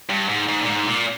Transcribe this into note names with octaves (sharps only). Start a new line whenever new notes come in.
G2
G#2
G#2
A#2
G#2
A#2